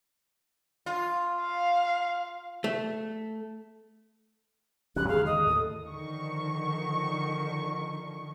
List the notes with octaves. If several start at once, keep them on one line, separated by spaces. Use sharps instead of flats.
F4
F5
A3
D1 F#3 C#4 G4 F#6
D#2 G#2 D3 G#4 F5
D#5 D#6
A2 D#3 A4
D3 D#3 F3 C#6